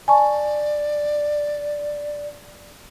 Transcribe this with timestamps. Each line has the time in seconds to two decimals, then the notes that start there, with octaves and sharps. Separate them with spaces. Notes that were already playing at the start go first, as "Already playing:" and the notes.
0.08 D5 G#5 A5 C#6